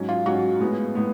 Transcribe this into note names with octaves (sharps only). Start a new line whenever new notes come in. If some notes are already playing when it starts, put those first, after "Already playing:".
Already playing: G#2 F#3 C#4
F4
G#2 F#3 C#4 F#4
A2 G#3 B3
A2 G#3 B3